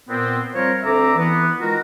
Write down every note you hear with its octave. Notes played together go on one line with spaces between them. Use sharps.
A#2 B3 C4
F3 G3 C4 A#4 C5 C#5
D2 C4 A4 D5 E5 A#5
E3 B3
D#3 G#3 F4 F#4 A#4